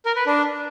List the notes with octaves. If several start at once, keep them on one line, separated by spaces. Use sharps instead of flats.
A#4
B4
D4